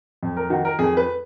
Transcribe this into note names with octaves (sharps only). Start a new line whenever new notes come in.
F2
A#4
D#3 F#4
A#4
F2 G#4
B4